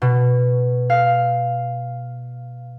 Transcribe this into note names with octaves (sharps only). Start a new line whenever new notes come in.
B2
F5